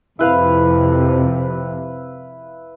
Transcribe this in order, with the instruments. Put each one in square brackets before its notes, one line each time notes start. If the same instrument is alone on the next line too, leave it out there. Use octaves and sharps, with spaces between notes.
[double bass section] F2 C3 [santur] E4 B4 F5